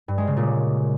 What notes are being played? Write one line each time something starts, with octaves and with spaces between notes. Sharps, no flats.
G2
G#3
C#3
A#2